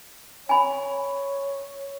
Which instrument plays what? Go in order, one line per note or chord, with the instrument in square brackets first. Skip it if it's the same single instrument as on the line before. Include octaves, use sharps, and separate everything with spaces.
[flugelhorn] C#5 [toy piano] G#5 B5